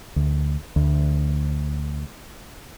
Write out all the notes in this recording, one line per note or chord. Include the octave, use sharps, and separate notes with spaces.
D2
D2